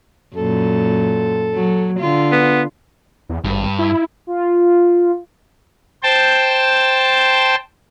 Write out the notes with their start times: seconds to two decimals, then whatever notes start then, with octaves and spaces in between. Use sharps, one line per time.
0.36 F#2 A#2 A4
1.54 F#3
1.99 D3 F4
2.32 B3
3.29 E2
3.44 G#1 G2
3.79 E4
4.27 F4
6.03 C5 G5 A5